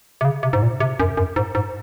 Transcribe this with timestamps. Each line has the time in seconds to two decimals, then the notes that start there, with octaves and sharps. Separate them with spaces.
0.21 C3
0.25 C#3
0.43 C3
0.53 G#2
0.63 A#2
0.80 C3
1.00 F#2
1.17 F#2
1.36 G#2
1.55 G#2